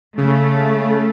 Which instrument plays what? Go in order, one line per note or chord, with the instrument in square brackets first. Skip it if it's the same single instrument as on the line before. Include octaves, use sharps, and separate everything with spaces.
[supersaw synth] C#3 [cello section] A3